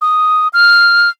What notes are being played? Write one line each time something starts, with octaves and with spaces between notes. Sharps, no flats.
D#6
F6